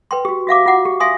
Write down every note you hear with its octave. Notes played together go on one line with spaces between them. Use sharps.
B4 G5 C6
F#4 G4
F#4 E5 F5 D6
F4 F#4 F#5 D6
G4
E5 F5 G#5 C6 D#6